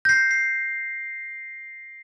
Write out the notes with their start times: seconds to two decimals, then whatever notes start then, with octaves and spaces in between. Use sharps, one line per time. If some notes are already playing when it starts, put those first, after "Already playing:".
0.05 G6 A#6 C7
0.31 C7